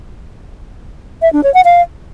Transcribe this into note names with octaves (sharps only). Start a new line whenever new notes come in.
E5
D4
C#5
F#5
F5